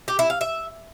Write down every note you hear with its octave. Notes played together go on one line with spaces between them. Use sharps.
G4
E4
F5
E5